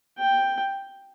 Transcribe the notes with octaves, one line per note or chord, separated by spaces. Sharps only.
G5